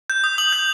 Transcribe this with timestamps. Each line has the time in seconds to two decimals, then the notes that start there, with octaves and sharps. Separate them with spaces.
0.10 G6
0.24 D#6
0.38 D#6 F#7
0.53 G6